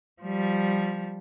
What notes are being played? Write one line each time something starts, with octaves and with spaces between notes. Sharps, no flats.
F3 G3